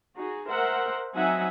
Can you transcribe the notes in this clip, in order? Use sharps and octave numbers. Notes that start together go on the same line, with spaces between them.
D#4 F#4 G#4
A#4 C5 E5 F#5
F#3 C4 D#4 E5 F#5 G#5